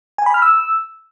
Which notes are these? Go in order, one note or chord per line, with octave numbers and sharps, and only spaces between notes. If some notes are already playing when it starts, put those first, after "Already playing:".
G#5
B5
F6
E6